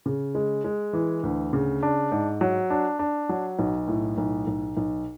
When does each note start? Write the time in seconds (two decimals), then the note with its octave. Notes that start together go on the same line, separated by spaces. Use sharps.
0.06 C#3
0.35 G#3
0.64 G#3
0.93 E3
1.23 D2
1.53 C#3
1.83 D4
2.12 G#2
2.41 F#3
2.70 D4
2.99 D4
3.29 F#3
3.59 B1
3.88 A2
4.18 B1
4.47 B1
4.77 B1